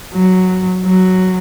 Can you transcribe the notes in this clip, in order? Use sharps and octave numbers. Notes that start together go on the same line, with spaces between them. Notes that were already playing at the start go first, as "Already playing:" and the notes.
F#3
F#3